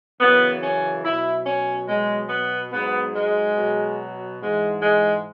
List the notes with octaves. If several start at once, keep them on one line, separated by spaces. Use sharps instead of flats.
F#2 C#3 E3 B3
C#4
B2 F#3 E4
C#4
B2 F#3 G#3
B3
G#2 F#3 B3
G#3
B2 F#3
G#2 E3 G#3
G#3